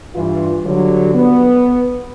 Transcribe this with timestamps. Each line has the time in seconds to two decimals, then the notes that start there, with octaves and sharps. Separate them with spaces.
0.15 G2 E3 F4
0.65 D3 F#3 G3
1.15 B3